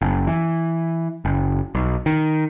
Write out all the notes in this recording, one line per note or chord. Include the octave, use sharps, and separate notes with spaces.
F#1
E3
F#1
B1
D#3